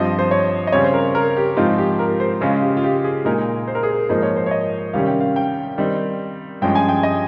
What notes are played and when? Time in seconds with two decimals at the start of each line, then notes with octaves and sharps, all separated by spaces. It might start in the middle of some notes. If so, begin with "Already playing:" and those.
Already playing: G2 F3 C4 D#5
0.19 C5
0.31 C#5
0.67 D#5
0.72 C#3 G3 C4 C#5
0.84 C5
0.93 A#4
1.15 A#4
1.37 G4
1.57 G#2 F3 C4 D#4 F4
1.78 G4
1.99 A#4
2.20 C5
2.41 C#3 G#3 C#4 F4
2.62 G4
2.77 F4
2.83 G4
3.04 G#4
3.25 A#2 G#3 D#4 A#4
3.68 C5
3.75 A#4
3.83 G#4
3.90 A#4
4.09 G#2 F3 A#3 D#4 C5
4.23 C#5
4.37 C5
4.46 C#5
4.51 D#5
4.93 C3 D#3 G3 C#4 F5
5.07 G5
5.20 F5
5.36 G5
5.78 D#3 G3 C4 D#4
6.62 G2 F3 G#3 C#4 G5
6.75 G#5
6.89 G5
7.03 D#5